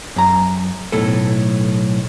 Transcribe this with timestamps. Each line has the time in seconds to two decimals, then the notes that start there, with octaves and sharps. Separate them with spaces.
0.16 F#2 A#5
0.92 B1 A2 A4